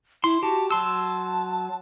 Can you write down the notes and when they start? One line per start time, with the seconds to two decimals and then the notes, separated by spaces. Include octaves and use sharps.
0.24 E4 C6
0.43 F#4 G4 A5
0.71 F#3 A5 C6 E6